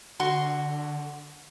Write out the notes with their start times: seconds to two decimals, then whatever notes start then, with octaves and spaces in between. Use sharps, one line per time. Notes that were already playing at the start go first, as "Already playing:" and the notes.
0.19 D3 F#4 C6 C#6